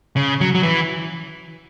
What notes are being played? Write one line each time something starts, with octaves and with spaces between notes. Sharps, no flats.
C#3
F#3
F#3
E3